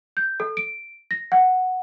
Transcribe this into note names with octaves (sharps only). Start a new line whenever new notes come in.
G6
A4
D7
A#6
F#5